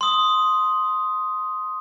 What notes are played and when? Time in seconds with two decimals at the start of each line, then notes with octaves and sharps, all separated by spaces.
0.01 C6 D#6